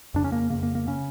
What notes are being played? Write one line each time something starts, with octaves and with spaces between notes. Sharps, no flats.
F2 C#3 D4
C#4
A#3
F2 C#3 A#3
A#3
A#3
C#3 C#4